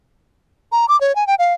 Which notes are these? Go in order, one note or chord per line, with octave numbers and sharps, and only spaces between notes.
A#5
D6
C#5
G#5
G5
F5